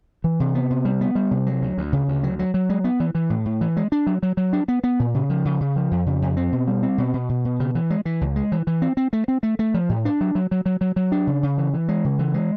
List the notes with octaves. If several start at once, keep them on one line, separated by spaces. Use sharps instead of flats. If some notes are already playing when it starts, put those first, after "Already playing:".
E3
C3
B3
C3
G3
B3
G3
C3
F#3
D2
D2
C#3
D2
F#3
F#3
F#3
G#3
B3
E3
E3
A2
A2
E3
G#3
D4
F#3
F#3
F#3
D4
B3
B3
A#2
C#3
F3
C#3
C#3
F3
F2
C#3
F2
C4
B2
G3
C4
B2
B2
B2
B2
C#3
E3
G#3
E3
C#2
G#3
E3
E3
C4
C4
A3
C4
A3
A3
F3
A2
D4
F#3
F#3
F#3
F#3
F#3
F#3
D4
C#3
C#3
E3
E3
G#3
C#3
E3
G#3